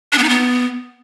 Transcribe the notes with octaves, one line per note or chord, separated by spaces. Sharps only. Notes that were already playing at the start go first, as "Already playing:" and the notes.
D4
B3
D#4
B3